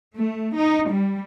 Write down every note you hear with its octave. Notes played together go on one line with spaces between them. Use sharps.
A3
D#4
G3